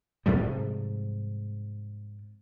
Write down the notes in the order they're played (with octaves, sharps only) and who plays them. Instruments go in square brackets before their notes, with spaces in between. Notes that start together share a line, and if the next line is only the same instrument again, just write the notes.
[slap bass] G#2 C3 F3 G3